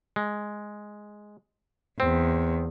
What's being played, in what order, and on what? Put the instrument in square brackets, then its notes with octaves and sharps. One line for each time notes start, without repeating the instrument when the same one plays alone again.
[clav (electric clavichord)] G#3
[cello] E2 [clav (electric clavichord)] C4